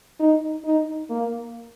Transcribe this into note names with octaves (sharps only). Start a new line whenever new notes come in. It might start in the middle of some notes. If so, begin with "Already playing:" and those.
D#4
D#4
A#3